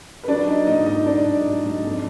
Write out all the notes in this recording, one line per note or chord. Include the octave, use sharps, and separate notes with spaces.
B4
F#3 D4 D5
F#3 D#4 D#5
G#2 D#4 D#5
F#3 D#4 D#5
F#3 D4 D5
G#2
F#3
G#2
F2